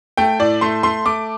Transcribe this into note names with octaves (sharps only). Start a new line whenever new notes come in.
A3 G5
A2 D5
A3 C6
A3 C6
A3 D6